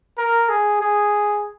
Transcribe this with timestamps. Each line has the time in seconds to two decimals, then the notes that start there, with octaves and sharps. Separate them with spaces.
0.18 A#4
0.49 G#4
0.81 G#4